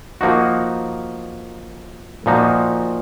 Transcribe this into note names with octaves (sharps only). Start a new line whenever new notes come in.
F3 A#3 D#4 F#4
A#2 F3 A#3 D#4 F#4